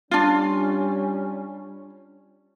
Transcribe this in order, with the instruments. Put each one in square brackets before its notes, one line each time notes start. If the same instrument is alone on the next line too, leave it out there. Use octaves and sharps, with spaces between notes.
[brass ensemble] G3 C#4 [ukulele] D4 F4